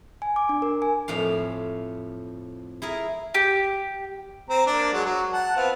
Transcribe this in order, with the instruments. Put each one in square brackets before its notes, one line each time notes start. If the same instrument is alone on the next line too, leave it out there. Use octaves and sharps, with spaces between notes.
[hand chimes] G#5
D6
D4
A#4
G#5
[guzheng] F2 A2 F5
E4 G#4 A#4
[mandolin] G4
[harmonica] C4 A#5
A#3 D4 D5
F#3 G#3 F#5
F#3
F#5 A5
B3 C4 F4